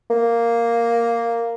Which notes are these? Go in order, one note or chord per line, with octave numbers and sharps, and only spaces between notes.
A#3